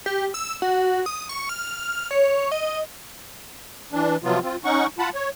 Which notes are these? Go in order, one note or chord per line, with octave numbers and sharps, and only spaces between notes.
G4
E6
F#4
D#6
C#6
F6
C#5
D#5
E3 D4
C3 F3 F#3 B3 F4
C4 F4
C#4 D#4 F#5 C#6
F4 F#5 A5 B5
C#5